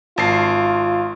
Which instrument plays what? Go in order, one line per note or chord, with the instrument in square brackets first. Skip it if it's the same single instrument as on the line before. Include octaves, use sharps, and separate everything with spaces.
[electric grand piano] G#1 A5 C7 [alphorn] F4